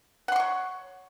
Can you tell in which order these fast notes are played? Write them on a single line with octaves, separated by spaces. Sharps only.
F#5 C6 C#6 C#5